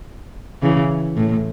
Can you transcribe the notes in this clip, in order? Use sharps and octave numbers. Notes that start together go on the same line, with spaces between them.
C#3 E3
A2